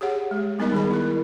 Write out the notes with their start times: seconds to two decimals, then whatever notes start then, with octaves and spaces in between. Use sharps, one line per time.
0.01 G4 G#4 C#5 F#5
0.31 G#3
0.59 G3 B3 D#4 A#4 D#5
0.72 D#3 G#4 B5
0.91 E4 A#4